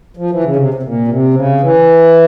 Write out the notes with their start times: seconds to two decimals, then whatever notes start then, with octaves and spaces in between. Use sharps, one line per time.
0.17 F3
0.31 E3
0.44 C#3
0.56 C3
0.74 C3
0.83 A#2
1.08 C3
1.34 C#3
1.61 E3